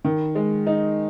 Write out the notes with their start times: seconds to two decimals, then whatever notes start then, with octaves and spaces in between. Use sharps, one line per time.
0.05 D#3
0.35 G#3
0.67 D#4